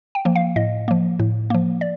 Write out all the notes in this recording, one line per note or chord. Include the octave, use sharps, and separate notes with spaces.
G5
F3 A#3
F5
A2 D#5
F3 A#3
A2
F3 A#3
D5